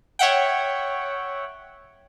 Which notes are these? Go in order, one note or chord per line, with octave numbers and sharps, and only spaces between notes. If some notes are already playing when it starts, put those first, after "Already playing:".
C#5 E5 F#5 G5